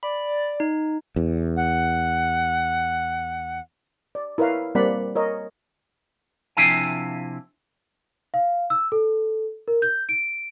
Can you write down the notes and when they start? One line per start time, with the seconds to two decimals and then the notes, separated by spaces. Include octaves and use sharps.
0.03 D5 B5
0.60 D#4
1.16 E2
1.56 F#5
4.15 D5
4.38 E4 A#4 B4 C#5 F5
4.75 G3 A#3 C4 D5 F#5 B5
5.15 A#4 C#5 D#5
6.57 C3 F3 D4 E4 F5 G#5
8.34 F5
8.70 E6
8.92 A4
9.68 A#4
9.82 G6
10.09 D7